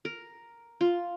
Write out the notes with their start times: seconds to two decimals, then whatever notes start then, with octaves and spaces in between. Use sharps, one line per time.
0.05 A#4
0.81 F4